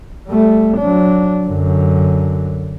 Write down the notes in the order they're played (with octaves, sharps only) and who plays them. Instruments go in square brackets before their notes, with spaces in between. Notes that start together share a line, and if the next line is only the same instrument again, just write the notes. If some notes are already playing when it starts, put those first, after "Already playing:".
[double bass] G3 A3
F#3 D4
F#2 D3